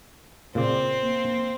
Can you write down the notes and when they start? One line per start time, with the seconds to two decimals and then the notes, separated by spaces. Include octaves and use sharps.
0.55 A#2 C#3 C4 D5
1.02 A#3